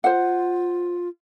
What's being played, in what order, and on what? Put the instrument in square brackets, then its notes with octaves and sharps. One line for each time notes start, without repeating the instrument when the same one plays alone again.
[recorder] F4 [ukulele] C5 F#5